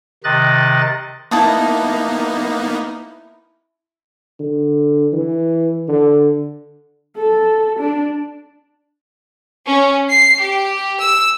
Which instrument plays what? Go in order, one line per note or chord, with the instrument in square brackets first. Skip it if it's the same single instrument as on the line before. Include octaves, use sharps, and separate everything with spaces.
[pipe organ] C3 D#3 D#5 F#6 A6
[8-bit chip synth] A#3 B3 D#4 [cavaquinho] E4 A5 D#6
[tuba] D3
E3
D3
[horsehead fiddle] A4
D4
[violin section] C#4
C7
G4
E6